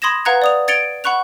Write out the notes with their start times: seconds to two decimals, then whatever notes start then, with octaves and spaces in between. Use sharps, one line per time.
0.02 B5 C6 D#6 G#6 A#6 E7
0.25 B4 F5 F#5 A#5 F#6 G#6
0.42 D5 D#6 F7
0.68 G#6 A6 C#7 D7 F7 G7
1.04 F#5 B5 C#6 F#6 F7